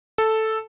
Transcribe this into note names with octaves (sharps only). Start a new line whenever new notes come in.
A4